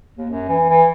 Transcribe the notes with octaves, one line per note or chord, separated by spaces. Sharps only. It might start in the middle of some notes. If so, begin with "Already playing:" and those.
D#2
F#2
E3
E3